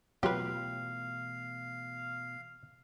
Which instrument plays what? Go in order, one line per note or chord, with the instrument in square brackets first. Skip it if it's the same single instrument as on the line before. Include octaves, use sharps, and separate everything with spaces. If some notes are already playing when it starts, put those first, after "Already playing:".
[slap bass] B2 E3 A3 [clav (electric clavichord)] F#3 F4 [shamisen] G4 B4 [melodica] F5